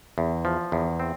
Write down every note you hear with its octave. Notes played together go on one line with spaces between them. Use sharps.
E2
F3
E2
C4